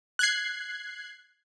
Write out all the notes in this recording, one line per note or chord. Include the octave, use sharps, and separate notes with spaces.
F#6 G#6 C7